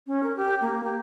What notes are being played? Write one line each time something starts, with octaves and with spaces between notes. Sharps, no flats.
C#4
A#4
G4
A#3
G4